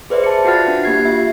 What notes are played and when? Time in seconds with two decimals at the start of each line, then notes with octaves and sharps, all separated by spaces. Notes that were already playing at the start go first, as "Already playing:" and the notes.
0.10 G#4 B4 C5 D5 E5
0.24 A5 C#7
0.45 F4 F#4 E5 F#5 F6 A6
0.68 D4
0.83 A#3 G4 G#6 C7
1.04 F4 E5